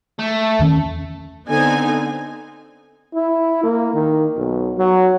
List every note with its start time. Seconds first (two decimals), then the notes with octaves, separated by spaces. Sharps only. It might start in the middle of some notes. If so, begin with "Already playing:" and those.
0.19 A3
0.59 E2 D#3 C#4
1.48 D3 B3 C4 D#4 G#5
3.14 E4
3.63 A#3
3.93 D#3
4.37 B1
4.78 F#3